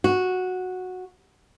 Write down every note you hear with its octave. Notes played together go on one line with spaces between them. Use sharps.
F#4